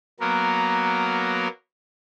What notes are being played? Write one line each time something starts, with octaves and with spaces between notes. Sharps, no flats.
F#3 A#3 B3 A#4